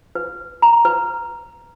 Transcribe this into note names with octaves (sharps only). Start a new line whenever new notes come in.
B4
A#5
B4